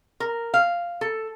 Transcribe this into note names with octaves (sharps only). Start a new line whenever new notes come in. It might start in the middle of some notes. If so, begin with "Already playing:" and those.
A#4
F5
A4